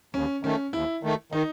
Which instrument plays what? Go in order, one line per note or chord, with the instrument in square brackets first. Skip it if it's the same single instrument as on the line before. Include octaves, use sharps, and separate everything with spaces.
[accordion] D#2 [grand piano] C#4
[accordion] D#3 A3 [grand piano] C#4
[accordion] D#2 [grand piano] E4
[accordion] D#3 A3
[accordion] D#3 [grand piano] D#4